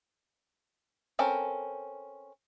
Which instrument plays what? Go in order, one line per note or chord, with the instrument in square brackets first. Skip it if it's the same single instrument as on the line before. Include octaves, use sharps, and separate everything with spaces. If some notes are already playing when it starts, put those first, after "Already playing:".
[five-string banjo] C4 C#4 A4 A#4